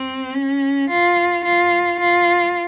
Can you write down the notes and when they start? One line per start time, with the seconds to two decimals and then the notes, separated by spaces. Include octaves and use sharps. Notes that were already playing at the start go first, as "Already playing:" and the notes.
Already playing: C4
0.35 C#4
0.89 F4
1.45 F4
2.00 F4